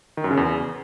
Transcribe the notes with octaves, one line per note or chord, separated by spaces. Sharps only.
D#3
F#2
C#3
E2